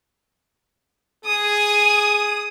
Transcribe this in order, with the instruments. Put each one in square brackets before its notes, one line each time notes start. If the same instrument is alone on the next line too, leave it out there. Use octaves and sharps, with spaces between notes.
[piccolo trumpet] G#4 [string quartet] D#6